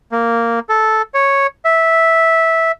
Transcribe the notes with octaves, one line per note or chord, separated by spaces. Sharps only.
A#3
A4
C#5
E5